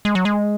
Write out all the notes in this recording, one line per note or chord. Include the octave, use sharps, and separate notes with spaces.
G#3
F#3
G#3